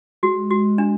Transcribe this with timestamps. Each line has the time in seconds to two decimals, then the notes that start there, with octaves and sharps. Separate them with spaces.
0.23 G#3 F#4
0.51 F#4
0.78 D4